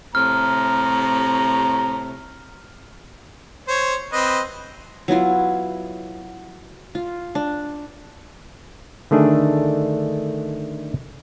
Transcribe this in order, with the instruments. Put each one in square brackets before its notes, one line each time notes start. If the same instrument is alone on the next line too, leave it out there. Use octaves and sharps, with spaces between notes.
[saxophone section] A2 C3 [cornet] A#5 [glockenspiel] F6
[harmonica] C5 C#5
C4 B4 D#5
[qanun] F#3 B3 E4 F4
F4
D4
[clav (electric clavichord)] D3 D#3 A3 D4 G#4